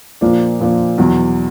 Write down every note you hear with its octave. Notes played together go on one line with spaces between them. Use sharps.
A#2 F3 A#3 D4
A#2 F3 A#3 D4
E2 B2 F#3